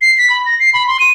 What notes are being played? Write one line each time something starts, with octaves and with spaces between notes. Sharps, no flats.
C7
B6
B5
A#6
C7
B5
C6
D#7